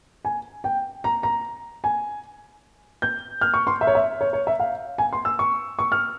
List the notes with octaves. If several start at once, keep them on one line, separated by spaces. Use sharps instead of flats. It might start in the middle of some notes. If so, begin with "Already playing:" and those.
G#5
G5
A#5
A#5
G#5
G6
F6
C#6
C6
E5
C#5
E5
C#5
C#5
E5
F5
G#5
C6
E6
C#6
C#6
F6